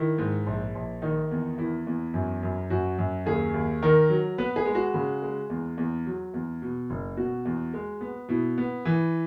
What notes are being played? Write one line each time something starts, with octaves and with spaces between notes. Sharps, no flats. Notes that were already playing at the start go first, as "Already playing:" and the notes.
Already playing: D#3 E4
G#2
A#1
A#1
D#3 D#4
E2
E2 E4
E2
F#2
F#2
F#2 F#4
F#2
D#2 G#4
D#2
D#3 A#4
F#3
B3 B4
G#4
G#3
F#4
C#3
G#3
E2
E2
F#3
E2
B2
F#1
B2 F#4
E2
G#3
B3
B2 E4
B3
E3